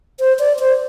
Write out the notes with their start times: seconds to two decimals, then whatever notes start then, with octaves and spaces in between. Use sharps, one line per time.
0.20 C5
0.39 D5
0.59 C5